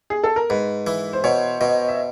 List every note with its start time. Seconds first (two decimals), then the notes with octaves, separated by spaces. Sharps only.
0.10 G#4
0.24 A4
0.36 A#4
0.50 G#2 B4
0.87 E3
1.13 C5
1.24 B2 C#5
1.60 B2 D#5
1.89 E5